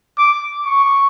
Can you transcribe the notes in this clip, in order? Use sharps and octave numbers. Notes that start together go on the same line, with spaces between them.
D6
C#6